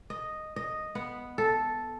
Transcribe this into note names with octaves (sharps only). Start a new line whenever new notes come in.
D#5
D#5
B3
A4